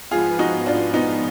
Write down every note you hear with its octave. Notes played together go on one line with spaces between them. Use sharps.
G#2 F3 B3 F4 G#4
D#4 F#4
D4 F4
B3 D#4